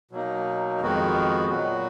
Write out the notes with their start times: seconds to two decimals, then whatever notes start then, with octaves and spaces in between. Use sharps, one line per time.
0.11 B2 F#3 A#3 D#4
0.80 F2 D#3 G#3 B3 F#4
1.49 A#2 F#3 B3 F#4